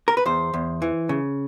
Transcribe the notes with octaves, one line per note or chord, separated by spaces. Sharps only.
A#4
B4
E2 C5
E2
E3
C#3